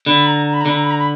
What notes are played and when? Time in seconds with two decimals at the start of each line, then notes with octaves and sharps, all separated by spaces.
0.06 D3 B5
0.26 A#5
0.46 A#5
0.53 B5
0.61 A#5
0.66 D3 B5
0.76 A#5
0.83 B5
0.90 A#5
0.98 B5